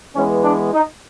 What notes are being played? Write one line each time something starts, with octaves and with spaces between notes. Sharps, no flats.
E3 G#3 B3 C#4
D4
D#4